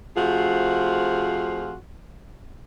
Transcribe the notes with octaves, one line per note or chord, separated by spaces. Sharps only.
C3 F3 A3 F4 F#4 G#4